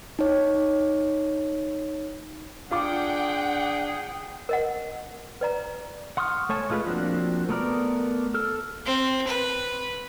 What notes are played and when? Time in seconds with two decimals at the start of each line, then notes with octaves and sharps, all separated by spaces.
0.19 D#4 C#5
2.71 D4 F4 G#4 F#5 G5 D6
4.49 A#4 D#5 F#5
5.41 B4 D5 A#5
6.17 F#5 C6 C#6 D#6 F6
6.49 A3 C#5 G#5 A5
6.70 G#3 A3 F4 G#4 B4
6.87 F3 A#3 C4 D4 F#4
7.49 A3 B3 A#4 D5
8.34 A4 F6
8.86 C4
9.28 B4